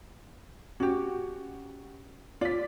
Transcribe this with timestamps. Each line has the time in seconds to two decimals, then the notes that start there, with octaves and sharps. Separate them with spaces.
0.80 C#4 F#4 G4
2.41 F4 D5 B6